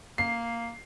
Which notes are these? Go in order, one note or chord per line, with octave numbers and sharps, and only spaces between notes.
A#3 C7